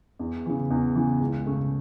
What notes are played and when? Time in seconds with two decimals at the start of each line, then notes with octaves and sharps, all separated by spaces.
0.19 E2
0.46 C#3 E3
0.71 E2
0.95 C#3 E3
1.20 C#2
1.46 C#3 A3